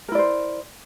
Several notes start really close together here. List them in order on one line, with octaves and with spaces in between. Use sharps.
A#4 E4 D5 C5